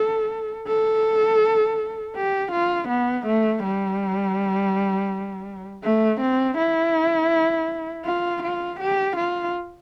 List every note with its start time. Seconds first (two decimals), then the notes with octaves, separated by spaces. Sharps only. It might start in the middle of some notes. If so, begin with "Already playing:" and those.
Already playing: A4
0.68 A4
2.16 G4
2.52 F4
2.88 B3
3.26 A3
3.63 G3
5.84 A3
6.21 C4
6.58 E4
8.06 F4
8.43 F4
8.80 G4
9.16 F4